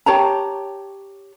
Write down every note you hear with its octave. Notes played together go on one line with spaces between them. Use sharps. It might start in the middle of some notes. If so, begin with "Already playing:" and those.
G4 C#5 A5 A#5